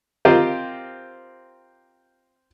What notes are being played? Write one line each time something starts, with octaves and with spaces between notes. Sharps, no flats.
C4 F4 G4 A#4 C5 D#5